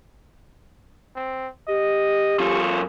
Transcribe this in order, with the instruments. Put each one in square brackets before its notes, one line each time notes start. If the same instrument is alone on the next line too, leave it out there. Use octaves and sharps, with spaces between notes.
[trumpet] C4
[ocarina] G4 [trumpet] D#5
[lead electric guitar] F#2 F4 [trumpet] C#6